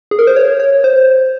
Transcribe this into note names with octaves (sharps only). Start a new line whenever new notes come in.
G#4
A#4
C5
C#5
C#5
C5